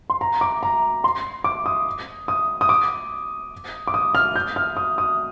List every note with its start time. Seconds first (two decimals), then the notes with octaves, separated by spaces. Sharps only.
0.10 C6
0.21 A#5
0.41 D6
0.63 A#5
1.04 C6
1.44 D6
1.66 D#6
2.28 D#6
2.61 D#6
2.69 D6
3.87 D6
3.94 D#6
4.15 F6
4.36 G6
4.56 F6
4.77 D#6
4.98 D#6